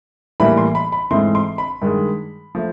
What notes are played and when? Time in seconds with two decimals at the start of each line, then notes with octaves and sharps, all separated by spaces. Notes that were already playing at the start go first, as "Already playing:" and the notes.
0.40 A2 E3 G3 A#3 B5
0.57 C6
0.75 B5
0.92 B5
1.11 G#2 E3 A3 C4 C6
1.35 C6
1.58 B5
1.82 G2 D#3 G#3
2.55 F3 A3